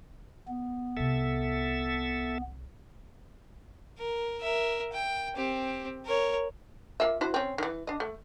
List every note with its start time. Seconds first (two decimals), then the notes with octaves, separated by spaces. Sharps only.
0.49 B3
0.97 C2 C3 A4 E5
3.98 A#4
4.41 A#4 E5
4.93 G5
5.36 C4 G4
6.06 A#4 C#5
7.00 A#3 F4 E5
7.21 E4 F#4 C5
7.34 C4 C#4
7.58 D#3 E3
7.87 D4 D#5
8.00 A3